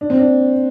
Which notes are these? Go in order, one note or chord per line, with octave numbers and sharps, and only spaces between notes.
D4
C4
D4